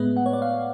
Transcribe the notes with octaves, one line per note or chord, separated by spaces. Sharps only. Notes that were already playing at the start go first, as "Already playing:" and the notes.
Already playing: A2 G#3 B3 B4
F#5
C#5
D5
F5